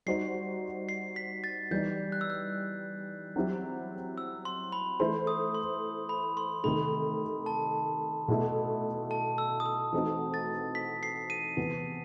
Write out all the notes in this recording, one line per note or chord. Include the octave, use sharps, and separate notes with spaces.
G3 D#4 F#4 C5 C7
C7
B6
A6
E3 G3 D#4 G6
F#6
E6
F#6
F#3 C4 E4 G4
E6
C6
B5
E3 A3 E4 A4 C5 C6
D#6
C6
B5
C6
C3 D#3 A3 B5
A5
B2 A3 E4 A4
A5
E6
D#6
E6
E3 A3 C4 D#4 F#4
A6
B6
C7
D#7
C3 E3 B3